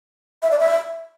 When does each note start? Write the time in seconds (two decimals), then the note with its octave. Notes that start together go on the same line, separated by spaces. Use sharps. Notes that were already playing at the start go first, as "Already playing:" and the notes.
0.43 E5
0.51 D5
0.60 E5